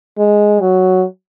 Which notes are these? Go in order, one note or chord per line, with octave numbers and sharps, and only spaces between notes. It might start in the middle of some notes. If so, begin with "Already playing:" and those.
G#3
F#3